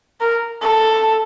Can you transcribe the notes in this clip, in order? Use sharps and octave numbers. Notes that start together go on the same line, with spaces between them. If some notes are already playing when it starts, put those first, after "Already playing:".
A#4
A4